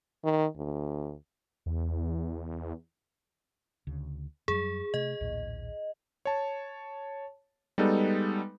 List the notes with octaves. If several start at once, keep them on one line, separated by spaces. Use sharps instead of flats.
D#3
D2
E2
D2 C#3
F#2 F#3 G3 G#4
C3 A3 D#5
A#1 D#2 A2
C#5 A5
G3 G#3 B3 D#4 A4 B4